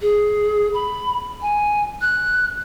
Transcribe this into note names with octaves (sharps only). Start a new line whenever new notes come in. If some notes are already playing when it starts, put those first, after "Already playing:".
G#4
B5
G#5
F#6